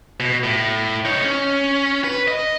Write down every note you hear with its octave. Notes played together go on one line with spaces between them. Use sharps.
B2
A2
D#4 C#5
C#4
B4
D#5